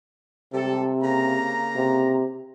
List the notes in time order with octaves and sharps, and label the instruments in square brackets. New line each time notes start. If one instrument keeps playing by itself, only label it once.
[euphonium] C3 [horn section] G3 G#3 A4
[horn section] C#3 A#3 A#5
[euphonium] C3